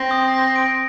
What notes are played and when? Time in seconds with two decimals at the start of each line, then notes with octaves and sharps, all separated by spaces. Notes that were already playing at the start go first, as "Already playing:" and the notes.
Already playing: C4 A#6
0.11 D#6
0.34 A#6
0.56 D7